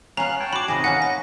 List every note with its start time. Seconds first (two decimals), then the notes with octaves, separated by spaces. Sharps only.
0.17 B3 C#4 F5 A#5 F#6
0.40 C#5 G5 A5
0.53 F#4 B5 D6
0.68 C3 D#3 G#4 D#5
0.84 A#3 C#4 B4 F#5
1.02 A#6